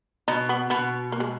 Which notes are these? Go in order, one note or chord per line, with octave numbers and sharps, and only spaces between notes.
B2 D#4
B3
B2 B3
A#3
G#3